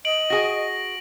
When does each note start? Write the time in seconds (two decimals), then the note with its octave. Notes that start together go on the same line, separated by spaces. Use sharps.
0.05 D#5 D7 F#7
0.30 F#4 G#4 A#6